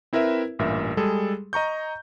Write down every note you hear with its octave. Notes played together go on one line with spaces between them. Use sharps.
C4 E4 A#4 B4 E5
A1 G2 A#2 A#4 E5
G3 G#3 G#4 A4
D#5 A#5 C#6 G6